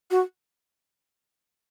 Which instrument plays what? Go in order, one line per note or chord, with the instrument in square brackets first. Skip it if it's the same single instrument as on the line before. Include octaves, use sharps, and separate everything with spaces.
[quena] F#4